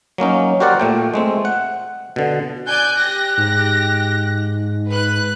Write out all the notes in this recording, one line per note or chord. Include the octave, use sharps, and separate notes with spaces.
F#3 A#3 C#4 D#4
F#4 G4 A#4 C5 D5 F#5
A#2 A3 G5
G#3 A3 C4
F#5
B2 D3
D5 G#5 F#6 G6
G4 A#6
G#2
B4 F#6